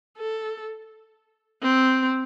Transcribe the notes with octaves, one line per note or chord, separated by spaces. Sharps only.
A4
C4